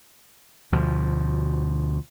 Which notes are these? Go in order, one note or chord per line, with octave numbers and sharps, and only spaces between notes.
D2 B2 F3